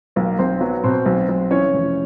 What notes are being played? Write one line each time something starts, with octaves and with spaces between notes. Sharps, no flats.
B1 A#3 A#4
B1 C4 C5
F#3 B3 B4
B2 C4 C5
B1
B1
E3 C#4 C#5
F1